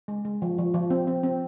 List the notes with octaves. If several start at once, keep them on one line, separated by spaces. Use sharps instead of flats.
G#3
G#3
F3
F3
F3
C4
C4
C4